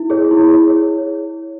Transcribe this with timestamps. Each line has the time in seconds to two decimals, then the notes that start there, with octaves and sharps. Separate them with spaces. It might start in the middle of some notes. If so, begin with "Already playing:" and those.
Already playing: E4
0.10 G#4 C#5
0.31 E4
0.50 G#4 C#5
0.70 C#5